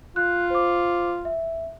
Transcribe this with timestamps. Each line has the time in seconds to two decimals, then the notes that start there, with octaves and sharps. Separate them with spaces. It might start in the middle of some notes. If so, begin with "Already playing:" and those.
0.16 F4 F#6
0.50 C5 D6
1.25 E5